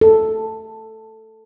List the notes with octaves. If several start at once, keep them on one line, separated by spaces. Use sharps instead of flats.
A4